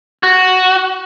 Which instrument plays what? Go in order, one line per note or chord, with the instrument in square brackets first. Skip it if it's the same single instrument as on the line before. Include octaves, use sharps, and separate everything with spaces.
[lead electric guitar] F#4